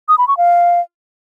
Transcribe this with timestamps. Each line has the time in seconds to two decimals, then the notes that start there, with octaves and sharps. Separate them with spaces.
0.09 D#6
0.18 B5
0.28 C#6
0.37 F5